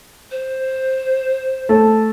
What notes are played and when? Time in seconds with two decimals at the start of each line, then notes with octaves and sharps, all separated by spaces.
0.31 C5
1.69 A3